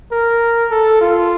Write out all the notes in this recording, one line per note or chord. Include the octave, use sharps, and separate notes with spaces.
A#4
A4
F4